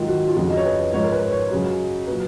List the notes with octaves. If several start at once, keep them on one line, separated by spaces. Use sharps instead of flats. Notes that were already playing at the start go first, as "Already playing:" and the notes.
Already playing: G#2 D#3 F#3 F4
F#4
F4
F2 C#3 F3 F#4
D#5
C#5
B4
G#2 F3 C#5
A#4
B4
C#5
F#2 C#3 F#3
A#2 F#3 B4